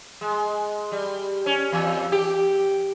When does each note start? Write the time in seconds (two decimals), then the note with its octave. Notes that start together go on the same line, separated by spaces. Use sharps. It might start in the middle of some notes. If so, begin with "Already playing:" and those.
0.21 G#3
0.92 G3
1.46 C#4
1.72 E2
2.12 G4